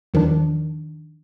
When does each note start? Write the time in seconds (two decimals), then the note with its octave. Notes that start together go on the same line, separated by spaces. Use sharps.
0.14 E2 D#3 F3 D4